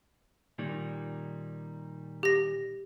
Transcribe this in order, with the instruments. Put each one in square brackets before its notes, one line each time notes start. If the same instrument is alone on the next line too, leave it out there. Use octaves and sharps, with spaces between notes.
[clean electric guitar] A#2 D#3 G3
[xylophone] G4 A#6